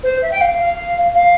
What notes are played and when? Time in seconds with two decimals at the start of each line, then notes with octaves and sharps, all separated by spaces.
0.03 C5
0.22 E5
0.31 G5
0.41 F5
0.59 F5
1.15 F5